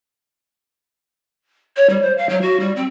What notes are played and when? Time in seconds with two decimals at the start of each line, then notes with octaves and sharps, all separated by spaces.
1.77 C#5
1.89 G3
2.02 C5
2.18 F5
2.29 F#3
2.42 F#4
2.60 G3
2.76 C4